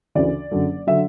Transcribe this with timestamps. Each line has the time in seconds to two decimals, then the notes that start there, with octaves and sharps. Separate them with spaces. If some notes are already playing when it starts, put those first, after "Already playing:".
0.15 D2 C#3 E3 D5
0.51 F#1 F#2 D3 F#3
0.87 D3 F#3 E5